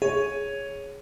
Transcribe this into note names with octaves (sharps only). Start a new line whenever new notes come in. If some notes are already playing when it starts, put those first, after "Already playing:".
G#4 C#5